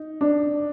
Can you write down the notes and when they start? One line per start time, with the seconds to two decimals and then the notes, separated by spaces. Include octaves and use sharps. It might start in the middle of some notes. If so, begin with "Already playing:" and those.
Already playing: D#4
0.21 D4